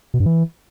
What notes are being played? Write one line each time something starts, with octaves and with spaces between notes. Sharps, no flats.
B2
G2
E3